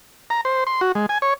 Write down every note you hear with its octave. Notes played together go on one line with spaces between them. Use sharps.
A#5
C5
C6
F#4
G#3
G#5
C#5